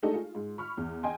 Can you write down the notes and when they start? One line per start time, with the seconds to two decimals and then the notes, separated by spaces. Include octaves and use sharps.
0.02 G#3 A3 D4 D#4 G4 A4
0.14 F4 G#4
0.35 G#2
0.58 B5 C#6 F6
0.77 E2
1.03 D#5 G5 G#5 C6